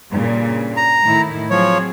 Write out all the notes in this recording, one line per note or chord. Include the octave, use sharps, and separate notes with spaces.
G2 A#2 C#3
A#5
A2 D#3 E4
F3 F#3 C4 G#4 C#5